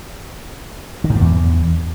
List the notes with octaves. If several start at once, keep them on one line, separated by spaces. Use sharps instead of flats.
D#3
G#2
G2
E2